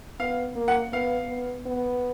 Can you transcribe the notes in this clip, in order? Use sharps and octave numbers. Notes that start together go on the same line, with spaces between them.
B3 F5
A#3
F#5
B3 F5
B3
B3